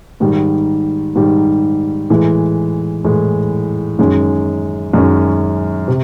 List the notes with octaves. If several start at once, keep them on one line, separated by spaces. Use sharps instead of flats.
G#2 D#3 G3
G#2 D#3 G3
A2 E3 G#3
A2 E3 G#3
F#2 D#3 G#3 C#4
F#2 D#3 G#3 C#4
C3